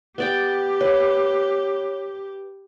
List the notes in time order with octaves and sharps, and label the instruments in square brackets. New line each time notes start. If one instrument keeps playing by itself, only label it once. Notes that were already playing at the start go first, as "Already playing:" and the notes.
[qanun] B3 D5 G5 [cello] G4
[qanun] B4 [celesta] C#5